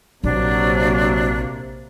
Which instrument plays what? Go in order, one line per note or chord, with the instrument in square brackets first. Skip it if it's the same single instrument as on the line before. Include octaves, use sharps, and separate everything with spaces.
[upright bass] A#1 [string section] C3 A#3 [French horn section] F#3 [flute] D4